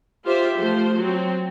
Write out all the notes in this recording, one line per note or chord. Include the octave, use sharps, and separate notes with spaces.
F4 G4 C5 E5
F3 A3 C5
F#3 C4